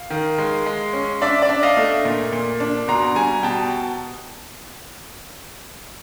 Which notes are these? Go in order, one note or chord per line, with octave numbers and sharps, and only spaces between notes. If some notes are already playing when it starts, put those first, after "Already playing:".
Already playing: F5
D#3
G#3
G#3
C#4
D4 D5 E5
D5 E5
D4
D#5 F5
A3
A#2
A#2
D4
B2 A#5 C6
G3 G#5 A#5
B2 G5 A5